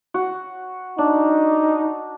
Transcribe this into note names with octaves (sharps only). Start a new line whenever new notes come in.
F#4
D4 D#4